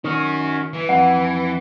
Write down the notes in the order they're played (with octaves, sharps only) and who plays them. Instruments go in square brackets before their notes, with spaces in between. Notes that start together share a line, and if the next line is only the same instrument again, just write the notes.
[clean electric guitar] D#3 [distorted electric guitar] C#4 F#4
[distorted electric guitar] E3
[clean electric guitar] F2 [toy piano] F#5